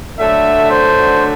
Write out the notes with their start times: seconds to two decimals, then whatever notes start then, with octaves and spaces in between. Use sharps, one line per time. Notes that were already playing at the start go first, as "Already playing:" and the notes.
0.18 D3 F#3 A3 D4 E5
0.71 C5